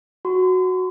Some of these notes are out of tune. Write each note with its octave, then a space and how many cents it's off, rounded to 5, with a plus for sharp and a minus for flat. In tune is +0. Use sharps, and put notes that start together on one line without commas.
F#4 -5 C6 -40